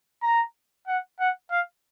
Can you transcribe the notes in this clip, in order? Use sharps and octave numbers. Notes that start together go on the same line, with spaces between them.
A#5
F#5
F#5
F5